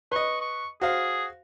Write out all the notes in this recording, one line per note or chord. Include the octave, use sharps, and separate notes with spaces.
B4 D#5 C#6
C#6
F#4 G#4 C5 F5